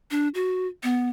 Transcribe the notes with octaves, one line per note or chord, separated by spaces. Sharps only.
D4
F#4
B3